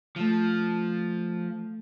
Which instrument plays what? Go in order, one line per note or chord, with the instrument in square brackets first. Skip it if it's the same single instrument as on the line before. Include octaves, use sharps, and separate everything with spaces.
[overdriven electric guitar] F3 [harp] A3 G6